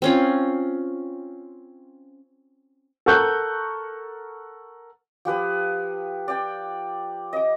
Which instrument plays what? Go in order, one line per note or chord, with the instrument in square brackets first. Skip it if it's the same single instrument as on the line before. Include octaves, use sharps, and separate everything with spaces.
[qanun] C4 C#4 F4
[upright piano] A4 A#4 F#5 C#6 F#6 G6
[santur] F3 G4 B4 D#6
D5 G5
D#5 D6